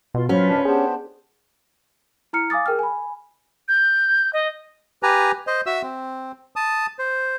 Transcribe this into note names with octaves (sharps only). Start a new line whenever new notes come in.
B2 F4 C6
F#3 C#4 F4 B4 C5
D#2 A#2 D4
B3 D4 G4 G#4 C5
E4 A#5 F6 C#7
F5 G#5 D6 D#6 A6
G#4 A#4 G5 F6
G#5 B5
G6
D#5
G4 B4 G#5 A#5
C5 D#5
F#4 E5 E6
C4
A5 D#6
C5